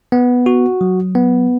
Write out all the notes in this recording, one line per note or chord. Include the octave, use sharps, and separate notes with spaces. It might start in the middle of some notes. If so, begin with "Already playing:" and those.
B3
F#4
F#3
B3